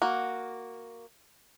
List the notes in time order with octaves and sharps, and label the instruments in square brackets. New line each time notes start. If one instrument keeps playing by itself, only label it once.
[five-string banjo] A#3 F#4